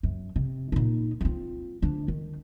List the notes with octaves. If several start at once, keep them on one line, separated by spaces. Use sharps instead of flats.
F#2
C3
A#2 D#4
C4 F4
D2 D4
D#3